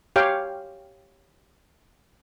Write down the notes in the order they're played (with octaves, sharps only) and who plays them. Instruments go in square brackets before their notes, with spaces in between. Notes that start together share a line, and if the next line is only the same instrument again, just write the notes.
[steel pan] G4 C#5 F5 G5